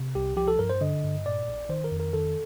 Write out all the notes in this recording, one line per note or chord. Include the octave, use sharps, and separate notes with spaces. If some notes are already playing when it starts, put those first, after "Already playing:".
Already playing: C3
C2 G4
F3 G4
A4
G2 A#4
C5
D3 D#5
G2
A#2 D5
A#1
D#3 C5
A#4
F2
A#4
D#3 A4